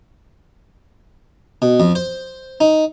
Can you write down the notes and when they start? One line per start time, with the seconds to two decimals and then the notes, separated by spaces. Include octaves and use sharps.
1.62 B2
1.80 F2
1.95 C5
2.61 D#4